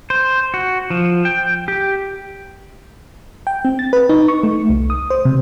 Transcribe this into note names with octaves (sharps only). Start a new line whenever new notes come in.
C5
F#4
F3
G5
G4
G5
C4
A6
B4
D#4
C#6
A3
C2
D#6
C5
C3